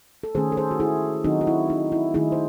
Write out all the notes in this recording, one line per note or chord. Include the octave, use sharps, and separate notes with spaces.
A4
D#3 A3 C#4 G#4 C5
A4
G#4 C5
F#4
E4 G#4
D#3 F#3 C4 D#4 F#4
F#4
E4
D#4
E4
D#3 A3 D#4 E4 G#4
C5